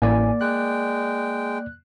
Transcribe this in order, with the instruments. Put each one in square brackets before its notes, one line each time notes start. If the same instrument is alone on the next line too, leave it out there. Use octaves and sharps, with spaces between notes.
[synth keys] A1 A2 G#5 [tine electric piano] A#3 D5
[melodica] G#3 G5 [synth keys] F#6